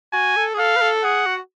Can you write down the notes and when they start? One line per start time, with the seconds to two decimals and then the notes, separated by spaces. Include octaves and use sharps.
0.13 F#4 G#5
0.36 A4
0.54 G#4
0.59 A4 F5
0.76 B4
0.81 A4
1.04 G#4 F#5
1.26 F#4